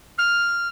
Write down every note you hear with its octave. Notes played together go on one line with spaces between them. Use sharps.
F6